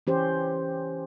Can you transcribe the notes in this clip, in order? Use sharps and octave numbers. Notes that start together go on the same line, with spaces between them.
E3 C#4 G4 C5